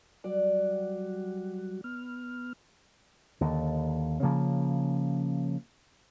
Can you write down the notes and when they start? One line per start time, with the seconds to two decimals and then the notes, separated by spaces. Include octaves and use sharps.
0.24 F#3 G3 F#4 D5
1.84 B3 F6
3.41 D#2 D3
4.23 C#3 F3 A#3